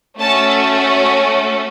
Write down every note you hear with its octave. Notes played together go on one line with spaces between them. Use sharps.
A3 C#4 F#4 A4 A5